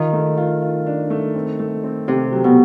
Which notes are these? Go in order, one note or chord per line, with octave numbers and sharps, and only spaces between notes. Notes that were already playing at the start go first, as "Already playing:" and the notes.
Already playing: D#3 F4
A3
F4
F4
D4
A3
C4
A3
C4
C3 A3
F#3
B2